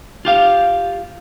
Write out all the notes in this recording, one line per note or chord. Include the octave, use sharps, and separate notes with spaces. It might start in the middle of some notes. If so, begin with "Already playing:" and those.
F4 G4 F5